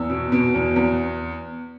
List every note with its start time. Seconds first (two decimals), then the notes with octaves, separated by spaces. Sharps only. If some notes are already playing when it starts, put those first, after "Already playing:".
Already playing: E2 E6
0.10 B2
0.32 B2
0.54 E2
0.76 E2